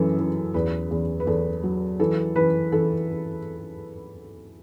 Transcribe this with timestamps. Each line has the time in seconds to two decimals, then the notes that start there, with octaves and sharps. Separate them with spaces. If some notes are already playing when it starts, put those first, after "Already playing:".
Already playing: F#2 E3 A4
0.18 E3
0.54 E2 B4
0.91 E2
1.20 B4
1.27 E2 A4
1.63 F#3
2.00 E3 A4
2.36 E3 B4
2.72 E3 A4